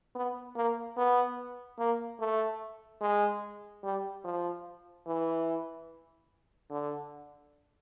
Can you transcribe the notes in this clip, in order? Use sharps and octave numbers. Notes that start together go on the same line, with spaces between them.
B3
A#3
B3
A#3
A3
G#3
G3
F3
E3
D3